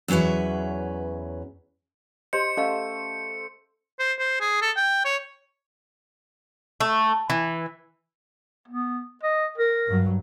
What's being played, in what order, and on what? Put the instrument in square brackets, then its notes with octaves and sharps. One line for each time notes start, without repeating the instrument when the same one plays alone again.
[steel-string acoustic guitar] E2 F#3 C#4 B4 E5
[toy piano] G4 D#5 C6 [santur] C5 [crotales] C#7
[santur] A3 [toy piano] C#4 D#5 F5
[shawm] C5
C5
G#4
A4
G5
C#5
[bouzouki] A3
E3
[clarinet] B3
D#5
A#4
[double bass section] G2 F#3